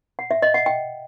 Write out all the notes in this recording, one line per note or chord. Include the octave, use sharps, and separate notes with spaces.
F#5
E5
D#5
F#5
G5